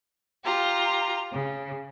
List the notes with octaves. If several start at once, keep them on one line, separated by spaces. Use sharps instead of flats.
F4 G4 A#5
C#3